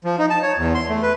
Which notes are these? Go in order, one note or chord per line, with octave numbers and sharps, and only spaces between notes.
F3
D#4
A5
C#5
E2
C6
A3
B4